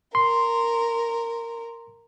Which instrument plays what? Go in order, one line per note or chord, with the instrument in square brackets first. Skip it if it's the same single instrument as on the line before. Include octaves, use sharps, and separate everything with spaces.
[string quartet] A#4 [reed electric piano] C6